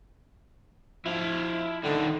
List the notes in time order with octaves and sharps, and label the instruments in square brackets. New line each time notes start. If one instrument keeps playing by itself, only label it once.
[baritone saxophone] F3 [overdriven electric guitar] E4 F5
[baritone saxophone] D3 [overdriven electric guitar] D#3 G3